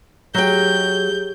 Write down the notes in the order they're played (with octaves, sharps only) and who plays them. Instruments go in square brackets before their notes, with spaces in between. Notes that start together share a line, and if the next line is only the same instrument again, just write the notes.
[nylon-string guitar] F#3 G5 [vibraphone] G4 G#4 [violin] G6